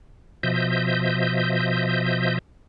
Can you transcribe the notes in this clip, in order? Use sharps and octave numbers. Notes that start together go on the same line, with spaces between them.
B2 F3 D#5 E5 G6